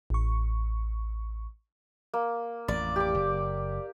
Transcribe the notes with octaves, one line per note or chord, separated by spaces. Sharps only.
A1 C#6
A#3
A1 F2 D5
G4 D6
F#1